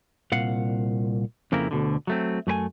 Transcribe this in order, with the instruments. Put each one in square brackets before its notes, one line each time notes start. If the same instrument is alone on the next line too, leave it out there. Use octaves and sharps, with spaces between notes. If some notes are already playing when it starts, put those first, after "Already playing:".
[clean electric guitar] C2 A#2 F5 F#5
F2 C#3 A#3 C4 E4 A#4
D2 B2 D3
F#3 A3 C4
F#2 A3 B4 G#5